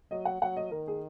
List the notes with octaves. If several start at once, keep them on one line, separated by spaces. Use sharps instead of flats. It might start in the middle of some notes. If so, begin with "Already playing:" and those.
F#3 D#5
F#5
F#3 F#5
D#5
D#3 A#4
G#4